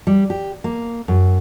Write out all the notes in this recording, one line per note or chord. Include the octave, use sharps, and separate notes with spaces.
G3
G4
A#3
F#2